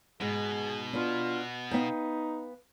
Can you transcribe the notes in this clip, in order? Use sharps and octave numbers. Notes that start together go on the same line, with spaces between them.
G#2 B2 G#4
B3 D4 F4
B3 D#4 F5 G5